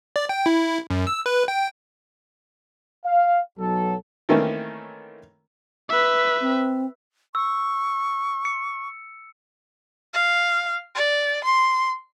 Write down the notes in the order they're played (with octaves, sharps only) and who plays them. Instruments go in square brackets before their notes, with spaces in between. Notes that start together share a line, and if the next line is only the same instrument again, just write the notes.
[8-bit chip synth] D5
G5
E4
F#2
E6
B4
G5
[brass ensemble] F5
B1 F#3 A4
[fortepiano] D#3 E3 A3 A#3 C4 C#4
[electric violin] B4 E5
[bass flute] C4
[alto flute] C#6 [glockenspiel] E6
[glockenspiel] C#7
[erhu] F5
D5
C6